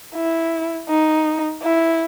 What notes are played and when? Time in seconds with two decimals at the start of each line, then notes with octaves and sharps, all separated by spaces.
0.14 E4
0.89 D#4
1.63 E4